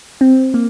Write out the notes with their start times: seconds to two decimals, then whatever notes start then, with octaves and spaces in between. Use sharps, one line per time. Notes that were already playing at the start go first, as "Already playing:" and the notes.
0.21 C4
0.54 A#3